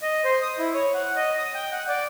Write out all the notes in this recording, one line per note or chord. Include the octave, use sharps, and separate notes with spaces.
D#5
C5
D#6
E4
C#5
F#5
D#5
D#6
G5
F#5
D5